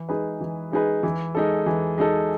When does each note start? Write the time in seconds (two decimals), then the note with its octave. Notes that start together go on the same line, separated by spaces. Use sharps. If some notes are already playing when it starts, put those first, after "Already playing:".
Already playing: E3
0.09 G#3 D#4 G#4 B4
0.41 E3
0.72 G#3 D#4 G#4 B4
1.03 E3
1.35 G#3 D#4 A4
1.66 E3
1.98 G#3 D#4 A4